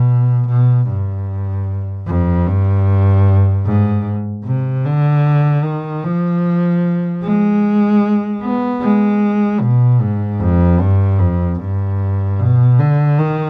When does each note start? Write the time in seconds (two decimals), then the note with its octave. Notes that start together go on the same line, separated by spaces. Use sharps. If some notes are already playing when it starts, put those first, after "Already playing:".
Already playing: B2
0.48 B2
0.88 G2
2.07 F2
2.46 G2
3.65 G#2
4.45 C3
4.85 D3
5.64 D#3
6.04 F3
7.23 G#3
8.42 B3
8.81 G#3
9.61 B2
10.01 G#2
10.40 F2
10.80 G2
11.20 F2
11.59 G2
12.39 B2
12.79 D3
13.18 D#3